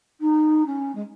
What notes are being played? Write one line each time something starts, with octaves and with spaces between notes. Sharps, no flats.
D#4
C#4
G#3